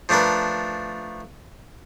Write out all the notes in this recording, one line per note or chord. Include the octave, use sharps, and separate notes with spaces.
F3 A3 D4 A#4 B4